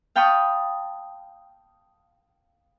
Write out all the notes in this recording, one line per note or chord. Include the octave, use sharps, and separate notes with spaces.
F5 G5 A5 B5 C#6 D#6